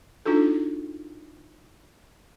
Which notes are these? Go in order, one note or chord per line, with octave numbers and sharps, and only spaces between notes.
D4 D#4 F4 F#4 A4